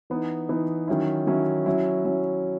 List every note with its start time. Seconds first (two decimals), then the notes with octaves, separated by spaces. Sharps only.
0.10 E3 B3 D#4
0.49 E3 B3 D#4
0.88 D#3 F#3 C#4 E4
1.27 D#3 F#3 C#4 E4
1.66 F#3 C#4 E4
2.05 F#3 C#4 E4